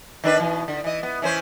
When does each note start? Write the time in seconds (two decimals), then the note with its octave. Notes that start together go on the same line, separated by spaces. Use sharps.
0.24 D#3 D4 B4
0.40 B2 E3
0.68 D3
0.84 E3 D#5
1.03 B3
1.22 E3 C#4 C5